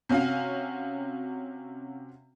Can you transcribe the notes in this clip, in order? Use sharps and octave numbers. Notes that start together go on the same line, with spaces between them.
C3 C#4 F#4 F5